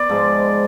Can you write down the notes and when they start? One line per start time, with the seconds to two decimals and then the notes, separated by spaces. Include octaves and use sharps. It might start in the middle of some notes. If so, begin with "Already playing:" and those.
Already playing: B3 D5
0.09 G#2 F3 G#3